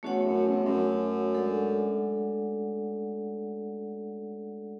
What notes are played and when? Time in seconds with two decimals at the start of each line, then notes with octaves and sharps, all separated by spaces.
0.03 E2 A3 C#4 F#4 C#5 F#5
0.25 F#2
0.47 E2
0.65 G#2
0.69 F#2
1.34 G#3 D4 A4 D5 F#5